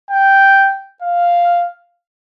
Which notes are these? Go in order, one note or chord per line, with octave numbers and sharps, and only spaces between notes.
G5
F5